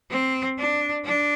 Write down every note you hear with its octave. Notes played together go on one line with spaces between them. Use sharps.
C4
D4
D4